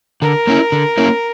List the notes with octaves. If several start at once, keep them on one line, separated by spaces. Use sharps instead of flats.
D3 A#4
A#3 C#4 E4
D3
A#3 C#4 E4